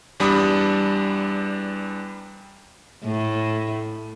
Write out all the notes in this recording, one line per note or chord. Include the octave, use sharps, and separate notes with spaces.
E2 G3 D4 B5 D#6
A2